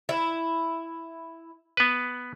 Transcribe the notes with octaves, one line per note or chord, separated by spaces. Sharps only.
E4
B3 B4